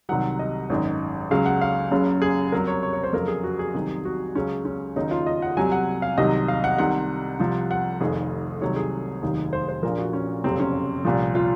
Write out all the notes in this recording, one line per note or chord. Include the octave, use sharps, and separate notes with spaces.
C2 C3 D#3 F#3 F#5
D#5
G#1 F#2 D#3
C#2 C#3 F#3 F5
F#5
F5
F#1 F#2 C#3 F#3
G#4
C2 C3 F#3 A#4
C#5
C#5
C#5
C5
F2 C#3 F#3 A#4
G#4
F#4
G#4
C2 C3 D#3 F#3
F#4
C#2 C#3 F#3 C#4
C#4
F#1 F#2 D#3 F#3 D#4
F4
D#5
F#5
C2 C3 F#3 G#5
F#5
F5
C2 C3 D#3 F#3 D#5
F5
F#5
C2 C3 D#3 F#5
C2 C3 F3
F#5
F1 F2 D#3 G#4
C2 C3 D#3 F#3 C#5
G#4
F1 D#2 D#3 F#3
C5
C5
A#1 A#2 F3 A#4
F#4
C#4
F#1 F2 C3 F#3 C4
C#4
C2 A#2 F3
F4